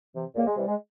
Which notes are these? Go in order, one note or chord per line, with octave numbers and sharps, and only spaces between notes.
C3 E3
C#2 A#2 A#3
G#3
C3 E3 G3
G#3